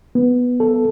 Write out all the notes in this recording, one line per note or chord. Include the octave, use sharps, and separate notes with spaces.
B3
A4